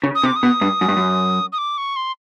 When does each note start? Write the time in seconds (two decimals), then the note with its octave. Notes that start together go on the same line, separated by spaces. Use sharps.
0.03 C#3
0.15 D#6
0.23 C3 D6
0.36 D#6
0.43 B2
0.61 G2
0.81 F#2
0.88 G2
0.97 F#2
1.52 D#6
1.58 D6
1.78 C#6
1.96 C6